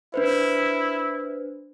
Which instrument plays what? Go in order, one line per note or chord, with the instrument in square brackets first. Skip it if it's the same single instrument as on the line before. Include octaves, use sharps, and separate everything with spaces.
[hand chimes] D4 B4 C5 [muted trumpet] E4